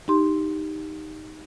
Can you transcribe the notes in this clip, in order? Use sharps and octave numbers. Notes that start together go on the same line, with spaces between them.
D#4 G4 C6